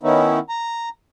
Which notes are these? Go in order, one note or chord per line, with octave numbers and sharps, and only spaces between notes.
D#3 B3 C#4 D#4 E4
A#5